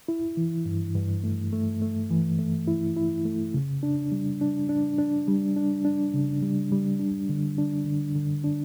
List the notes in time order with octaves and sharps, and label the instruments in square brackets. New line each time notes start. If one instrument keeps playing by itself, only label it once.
[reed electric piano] E4
E3
G2
G2
A3
A3
A3
E3
A3
E4
E4
A3
C#3
D4
G3
D4
D4
D4
G3
D4
D4
C#3
G3
G3
D4
D3
D4
D3
D3
D4